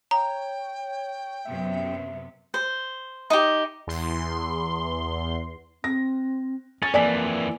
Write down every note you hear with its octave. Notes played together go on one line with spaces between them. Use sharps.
C#5 G5 A#5
F#2 C3 B3 E5
C5
D#4 G4
E2 C6
C4 A#6
C#4 A6
F2 E3 A#3 D5 G#5 B6